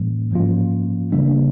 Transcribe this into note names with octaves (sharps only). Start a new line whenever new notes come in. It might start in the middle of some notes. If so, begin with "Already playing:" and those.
Already playing: A2 E3 G3 A#3 C#4
G#2 F3 A#3 C#4 F4
C#3 E3 G3 A#3 D4